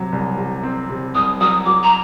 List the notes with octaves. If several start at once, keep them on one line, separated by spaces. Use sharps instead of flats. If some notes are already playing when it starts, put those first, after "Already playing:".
Already playing: C3 F#3
C2
C3
C4
C3
C2 D#6
F#3 D#6
F#3 D6
A#5